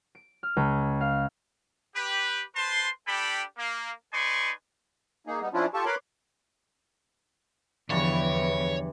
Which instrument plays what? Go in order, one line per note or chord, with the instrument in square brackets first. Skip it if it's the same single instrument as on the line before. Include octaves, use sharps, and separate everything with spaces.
[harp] D7
F6
C#2
F5
[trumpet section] G4 B4
B4 C5 A5 C6
D4 G4 A4 G5 B5
A#3
D#4 B4 D5 G#5 C6 C#6
[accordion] A#3 D#4 G#4
G3 B3 D#4
F3 C#4 D4 E4 F4
F4 G4 A4 A5 C#6
A#4 B4 C#5 B5 C6 D6
[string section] E2 [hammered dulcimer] G2 E3 A5 [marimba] D3 F3 [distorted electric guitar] C#5